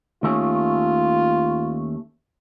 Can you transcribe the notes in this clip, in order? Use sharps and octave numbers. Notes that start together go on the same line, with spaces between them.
D#2 A3 C#4 F4